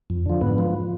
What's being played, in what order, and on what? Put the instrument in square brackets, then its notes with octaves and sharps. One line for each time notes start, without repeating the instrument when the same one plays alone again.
[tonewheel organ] F2
D3 F3
G#2 B3
F3